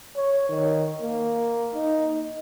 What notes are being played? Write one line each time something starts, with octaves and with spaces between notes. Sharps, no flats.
C#5
D#3
A#3
D#4